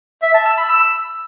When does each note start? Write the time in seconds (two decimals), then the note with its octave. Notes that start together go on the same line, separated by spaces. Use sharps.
0.22 E5
0.34 A5
0.46 E6
0.58 B5
0.69 E6